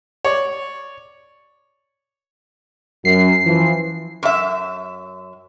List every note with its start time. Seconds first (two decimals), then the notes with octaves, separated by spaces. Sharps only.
0.25 C#5 D5
3.05 F#2 C7
3.45 E3 F3
4.23 F#2 E5